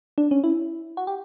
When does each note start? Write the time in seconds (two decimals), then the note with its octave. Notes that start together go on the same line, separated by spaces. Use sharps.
0.18 D4
0.31 C#4
0.44 E4
0.97 F#4
1.07 G4